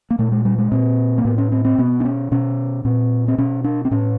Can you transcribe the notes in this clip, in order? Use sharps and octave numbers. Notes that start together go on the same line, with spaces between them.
A#3
A#2 A3
G#3
G3
G#3
A#2 C4
A#3
A2 B3
C#4
C4
C4
B2 B3
D4
C#4
B2 C#4
A#2 C4
C4
B2 C#4
D4
C4
A2 C#4